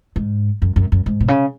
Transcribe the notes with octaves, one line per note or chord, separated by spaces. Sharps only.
G#2
F#2
F#2
F#2
G#2
B2
C#3